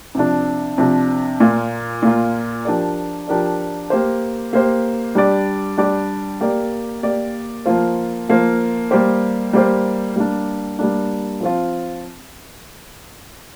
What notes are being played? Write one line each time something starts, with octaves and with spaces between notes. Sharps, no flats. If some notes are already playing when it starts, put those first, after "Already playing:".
C3 F3 D4
C3 F3 D4
A#2 A#3 F4
A#2 A#3 F4
F3 D4 G4 A#4 D5
F3 D4 G4 A#4 D5
A#3 G4 C5
A#3 G4 C5
G3 D4 G4 D5
G3 D4 G4 D5
A#3 G4 A#4 D5
A#3 G4 A#4 D5
F3 A#3 F4 C5
F3 A#3 F4 C5
G3 A#3 G4 C5
G3 A#3 G4 C5
G3 A#3 D4
G3 A#3 D4
F3 C4 F4